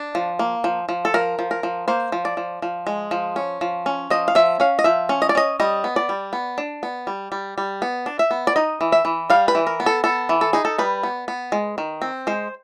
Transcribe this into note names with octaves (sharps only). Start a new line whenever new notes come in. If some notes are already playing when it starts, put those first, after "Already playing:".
Already playing: D4
F3
A#3
F3
F3
A4
F3 A#4
F3
A#4
F3
A#3 C5
F3
D5
F3
F3
G#3
F3
C#4
F3
C#4
F3 D#5
F5
F3 E5
C#4 F5
D#5
F3 E5
C#4
D#5
D5
C#4 D#5
G3 D#5
B3
D5
G3
B3
D4
B3
G3
G3
G3
B3
D4
E5
B3
D5
D#4 D#5
E3
E5
E3
G3 F5
B4
E3
A#4
B3
A4
B3 A4
E3
A4
D#4 G#4
A4
G3 B4
B3
B3
G#3
D#3
C4
G#3 C5